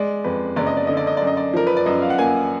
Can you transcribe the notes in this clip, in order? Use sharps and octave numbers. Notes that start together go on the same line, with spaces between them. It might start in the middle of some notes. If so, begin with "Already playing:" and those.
Already playing: G#3 D5
F2 B4
F#1 D5
D#5
D5
D3 D#5
D5
D#5
F#2 D5
D#5
D5
F3 A#4
B4
D5
F#2 D#5
F5
F#5
A#3 G#5